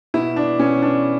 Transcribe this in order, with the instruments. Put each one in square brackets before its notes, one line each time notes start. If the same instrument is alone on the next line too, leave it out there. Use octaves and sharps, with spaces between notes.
[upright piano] B2 E4
D4
B2 C#4
D4